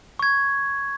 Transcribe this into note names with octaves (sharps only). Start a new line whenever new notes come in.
C#6 G#6